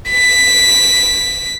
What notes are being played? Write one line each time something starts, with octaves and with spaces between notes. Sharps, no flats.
B6